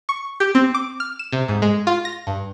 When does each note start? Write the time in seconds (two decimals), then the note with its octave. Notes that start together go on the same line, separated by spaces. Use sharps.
0.09 C#6
0.40 G4
0.55 C4
0.74 D6
1.00 F6
1.19 E7
1.32 C3
1.48 G#2
1.62 G#3
1.87 F4
2.05 A#6
2.27 G2